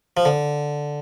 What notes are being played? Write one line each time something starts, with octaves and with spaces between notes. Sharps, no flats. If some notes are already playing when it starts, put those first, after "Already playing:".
F3
D3